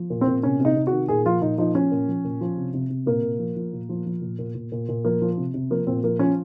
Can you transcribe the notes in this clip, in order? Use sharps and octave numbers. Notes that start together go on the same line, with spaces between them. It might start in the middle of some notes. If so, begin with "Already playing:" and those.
Already playing: F3
A#2
C4
A#2
C3 C#4
C3
D#4
C3
F#4
D#3
A#2 G#4
F3 F4
A#2 D#4
F3 D#4
F3 C#4
A#2
F3
A#2
F3
C3
C3
C3
A#2 A#3
A#2
F3
F3
A#2
F3
F3
A#2
A#2
A#2
A#2
A#2
F3 A#3
F3
C3
C3
F3 A#3
A#2 C4
F3 A#3
F3 C#4